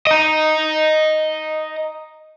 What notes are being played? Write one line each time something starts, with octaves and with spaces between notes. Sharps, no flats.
D#5 A#5